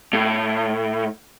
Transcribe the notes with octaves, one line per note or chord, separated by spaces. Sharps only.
A2